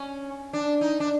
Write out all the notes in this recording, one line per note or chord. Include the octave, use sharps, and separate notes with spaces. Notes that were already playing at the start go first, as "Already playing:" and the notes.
Already playing: C#4
D4
D#4
D4